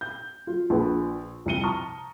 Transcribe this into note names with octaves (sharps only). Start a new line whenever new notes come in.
G6
F#3 F4
A#1 B4
C2 F2 C3 C#7 D#7 G7
A5 A#5 C#6 D#6 F6